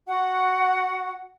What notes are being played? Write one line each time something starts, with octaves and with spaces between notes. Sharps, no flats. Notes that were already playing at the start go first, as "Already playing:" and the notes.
F#4 F#5